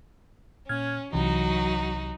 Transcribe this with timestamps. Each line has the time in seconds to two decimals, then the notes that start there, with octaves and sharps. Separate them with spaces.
0.69 A#2 C#4 F6 G#6
1.13 C2 C3 E3 F#3 D#4 F#4